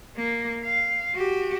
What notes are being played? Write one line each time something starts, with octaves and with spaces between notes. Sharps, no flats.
A#3
F5
F#4 G4